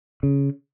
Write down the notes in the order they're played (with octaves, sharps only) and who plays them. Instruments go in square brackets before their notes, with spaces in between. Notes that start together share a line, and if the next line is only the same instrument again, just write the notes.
[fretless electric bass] C#3